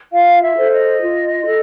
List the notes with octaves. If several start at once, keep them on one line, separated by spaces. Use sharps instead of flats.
F4 F5
E5
A4 C5
D#5
F4
A4